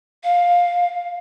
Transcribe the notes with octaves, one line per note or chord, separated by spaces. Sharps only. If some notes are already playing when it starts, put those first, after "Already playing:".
F5